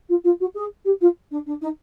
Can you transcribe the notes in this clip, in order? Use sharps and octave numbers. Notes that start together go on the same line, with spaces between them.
F4
F4
F#4
G#4
G4
F4
D4
D4
D#4